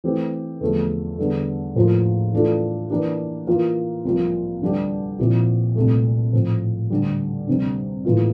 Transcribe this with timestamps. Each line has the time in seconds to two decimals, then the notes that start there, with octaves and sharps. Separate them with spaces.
0.04 E3 A3 C4 G4
0.61 E2 D3 F3 A3
1.18 E2 D3 G3 D4 A4
1.76 A2 F3 A#3 F4 A#4
2.33 E3 A3 D4 F4 A4
2.90 E3 A#3 D4 G4
3.47 E3 A#3 F4 A#4
4.05 C2 C3 F3 A#3 F4
4.61 D2 D3 G3 D4 G4
5.19 A#2 F3 C4 E4 G4
5.76 C2 A#2 A3
6.33 A2 F3 C4
6.90 D2 D3 G3
7.47 D2 C3 G3
8.05 A2 E3 A#3 F4